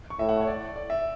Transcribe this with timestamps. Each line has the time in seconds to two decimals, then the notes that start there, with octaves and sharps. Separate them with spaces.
0.10 C#6
0.19 A2 E5
0.29 F#5
0.41 C#5
0.47 D5
0.76 D5
0.90 E5